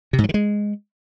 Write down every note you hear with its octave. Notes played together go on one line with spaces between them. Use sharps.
C3
G#2
F#3
D#3
G#3